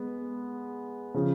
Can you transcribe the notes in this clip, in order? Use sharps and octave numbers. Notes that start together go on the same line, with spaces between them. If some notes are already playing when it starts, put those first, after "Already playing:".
Already playing: G#3 B3
C#3 F3